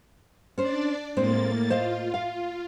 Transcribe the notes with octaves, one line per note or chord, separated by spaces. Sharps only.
C#4 D4 C5 D5
A2 G#3 A#3 C4 C5 A6
F4 C5 D#5 F5
F5